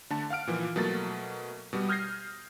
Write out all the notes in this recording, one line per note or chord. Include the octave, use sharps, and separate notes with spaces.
D3 A3 A5
F5 F#5 F6 D7
A#2 E3 F3
B2 F#3 A3 A#3 A6
B2 G3 B3
D#6 F6 G6 G#6 A#6 C7